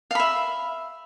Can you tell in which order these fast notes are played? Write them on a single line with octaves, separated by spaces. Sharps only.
F5 B5 E5